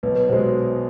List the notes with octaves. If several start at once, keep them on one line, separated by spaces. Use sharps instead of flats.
B1 B4
B4
B2 G#3 C5